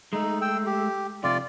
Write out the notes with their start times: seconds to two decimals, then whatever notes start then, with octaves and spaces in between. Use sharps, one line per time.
0.13 G#3 A3 D#4
0.42 G5 E6
0.66 G4
1.24 F2 C3 F4 D5